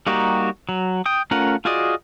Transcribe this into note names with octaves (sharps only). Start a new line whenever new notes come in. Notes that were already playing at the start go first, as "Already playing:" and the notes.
G3 A#3 D#4 F#4 G4
F#3
G5 D#6
A3 C#4 F4 A#4 F#5
F4 F#4 G#4 D5 D#5